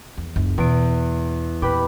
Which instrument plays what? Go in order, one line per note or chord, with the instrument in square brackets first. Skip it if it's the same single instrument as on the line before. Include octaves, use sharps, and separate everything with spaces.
[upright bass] E2
F#1 C#2
[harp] E2 D7 [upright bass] B2
[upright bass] A#2 [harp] G4 B4